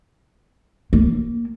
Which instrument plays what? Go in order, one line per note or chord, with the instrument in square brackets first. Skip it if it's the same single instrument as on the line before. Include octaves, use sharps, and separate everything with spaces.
[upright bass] A#3